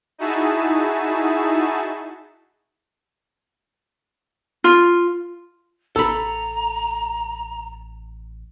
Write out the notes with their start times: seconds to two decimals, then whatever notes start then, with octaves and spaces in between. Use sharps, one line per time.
0.18 D#4 E4 F#4 G#4 E5 A5
4.64 F4
5.96 A1 A4 A#5 B5